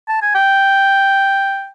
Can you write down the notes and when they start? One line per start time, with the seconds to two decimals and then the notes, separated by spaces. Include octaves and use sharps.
0.08 A5
0.22 G#5
0.35 G5